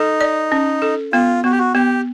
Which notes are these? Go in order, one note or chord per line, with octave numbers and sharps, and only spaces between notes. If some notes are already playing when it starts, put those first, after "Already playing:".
Already playing: D#4 A4
D5
C#4
A4
B3 F4
B3 F#4
G4
F#4
B3 G4